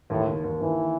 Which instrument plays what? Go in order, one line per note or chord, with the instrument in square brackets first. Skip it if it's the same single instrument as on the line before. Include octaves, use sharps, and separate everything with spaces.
[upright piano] D#2 [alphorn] A2
[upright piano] D#3
D#2
[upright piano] D#2 [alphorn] E3